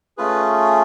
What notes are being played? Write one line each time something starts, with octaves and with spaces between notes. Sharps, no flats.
A3 C#4 F4 G#4 B4